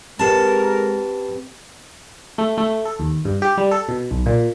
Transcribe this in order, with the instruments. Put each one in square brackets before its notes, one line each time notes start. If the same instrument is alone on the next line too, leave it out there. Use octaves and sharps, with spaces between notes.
[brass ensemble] G#3 A#4 [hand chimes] C4 G4 B4 [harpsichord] A5
[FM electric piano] A3
A3
A4
D#2
G2
G4
G3
A4
B2
B1
A#2